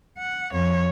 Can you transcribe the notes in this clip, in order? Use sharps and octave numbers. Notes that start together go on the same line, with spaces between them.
F#5
F2 C#5